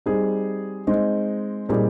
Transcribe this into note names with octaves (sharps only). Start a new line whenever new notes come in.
G3 C4 D#4 G#4
G#3 C4 D#4
A#2 G3 C4 D#4 G#4